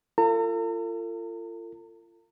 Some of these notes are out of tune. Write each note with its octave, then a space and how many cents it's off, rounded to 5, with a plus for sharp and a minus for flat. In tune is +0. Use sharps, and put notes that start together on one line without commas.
F4 -30 A4 +40 A#5 -40